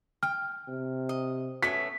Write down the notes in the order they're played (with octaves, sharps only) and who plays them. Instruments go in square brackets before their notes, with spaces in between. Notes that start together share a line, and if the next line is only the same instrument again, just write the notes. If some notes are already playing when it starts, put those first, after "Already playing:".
[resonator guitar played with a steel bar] G5 [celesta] F6
[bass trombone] C3
[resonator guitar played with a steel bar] D#5
[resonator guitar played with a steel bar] A3 B3 C#4 [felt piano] B6